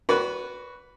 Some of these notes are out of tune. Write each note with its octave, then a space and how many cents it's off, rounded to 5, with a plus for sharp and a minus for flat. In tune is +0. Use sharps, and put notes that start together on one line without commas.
F#4 +0 B4 +0 D5 -40